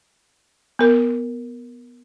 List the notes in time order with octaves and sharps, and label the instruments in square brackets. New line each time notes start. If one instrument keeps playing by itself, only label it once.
[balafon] B3 A#4